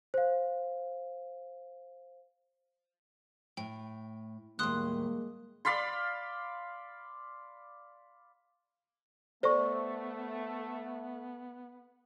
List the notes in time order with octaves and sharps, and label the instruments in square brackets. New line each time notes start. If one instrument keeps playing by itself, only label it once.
[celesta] C5 F5
[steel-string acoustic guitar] A2 [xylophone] G5
[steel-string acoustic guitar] D#2 A2 [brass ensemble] G3 G#3 A#3 [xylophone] C6 D#6 F#6
[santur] D5 F5 B5 C6
[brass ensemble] A3 [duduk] B3 [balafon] A4 D5 [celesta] C5 C#6